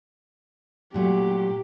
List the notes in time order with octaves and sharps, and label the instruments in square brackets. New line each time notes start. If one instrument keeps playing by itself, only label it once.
[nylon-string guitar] A#2 F#3 A3 [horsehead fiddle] G4